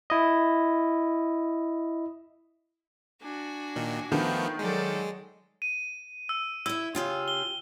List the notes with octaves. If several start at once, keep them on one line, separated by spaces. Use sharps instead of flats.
E4 D#5
D4 F#4 G#5
A#2 D#3
D#3 F3 A3 B3
F#3 G#3 A4 D5
D#7
E6
E4 E5 E6
C#3 F4 G4
G7